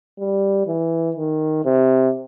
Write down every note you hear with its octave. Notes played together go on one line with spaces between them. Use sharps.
G3
E3
D#3
C3